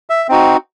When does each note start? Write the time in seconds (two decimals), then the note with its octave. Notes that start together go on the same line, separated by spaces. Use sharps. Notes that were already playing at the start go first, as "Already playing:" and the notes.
0.10 E5
0.29 C4 D#4 F#4